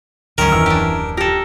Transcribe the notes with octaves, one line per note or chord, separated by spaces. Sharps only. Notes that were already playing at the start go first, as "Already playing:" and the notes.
D2 D#3 F#3 C#4 A#4
D#1 F#2 E3 E6
D4 G4
G4 A4 A#4